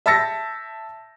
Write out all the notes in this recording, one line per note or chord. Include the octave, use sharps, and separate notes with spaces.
E5 A5 E6 A6 A#6 C#7